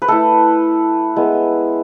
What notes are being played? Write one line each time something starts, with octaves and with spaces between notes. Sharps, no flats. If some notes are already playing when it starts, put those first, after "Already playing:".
B4
A3 E4 A4
G#3 B3 E4